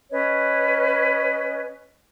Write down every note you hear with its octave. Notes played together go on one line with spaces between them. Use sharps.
C#4 B4 C#5 D#5